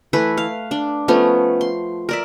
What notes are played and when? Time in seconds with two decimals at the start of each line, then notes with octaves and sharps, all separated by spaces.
0.13 E3 A3 E4 B4
0.37 F5
0.71 D4
1.08 F3 A3 B3 C#4
1.61 C6
2.09 A#4 D5 E5